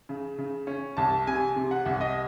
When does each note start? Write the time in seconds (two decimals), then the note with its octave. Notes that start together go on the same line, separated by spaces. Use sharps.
0.09 C#3
0.38 C#3
0.67 C#4
0.97 C2 A5
1.27 C3 G#5
1.56 C3
1.71 F#5
1.85 C2 F#5
2.01 D#5